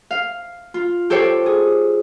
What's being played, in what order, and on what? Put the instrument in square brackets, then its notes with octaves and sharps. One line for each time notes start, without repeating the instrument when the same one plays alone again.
[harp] F5
F4
G4 A4 C5 C#5 G5
G#4